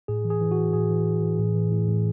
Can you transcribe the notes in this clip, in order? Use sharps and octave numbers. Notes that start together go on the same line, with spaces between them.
A2 G#4
E3
G#4
E3
F#4
E3
A2 G#4
E3
E3
E3
A2
E3
A2
A2